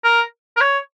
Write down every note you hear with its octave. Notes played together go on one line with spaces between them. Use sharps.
A#4
A#4
C#5